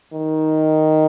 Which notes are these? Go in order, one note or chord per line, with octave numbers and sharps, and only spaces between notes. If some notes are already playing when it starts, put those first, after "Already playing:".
D#3